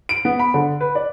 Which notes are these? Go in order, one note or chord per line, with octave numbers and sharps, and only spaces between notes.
D7
B3
B5
D3
B4
D5